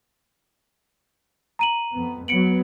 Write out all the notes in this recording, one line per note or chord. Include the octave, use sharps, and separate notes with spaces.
A#5 D#7 F#7
F2 B3
F#3 B3 C#7 D7 F#7